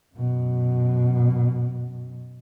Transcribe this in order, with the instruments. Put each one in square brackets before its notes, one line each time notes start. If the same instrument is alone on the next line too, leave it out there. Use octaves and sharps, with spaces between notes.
[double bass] F#2 B2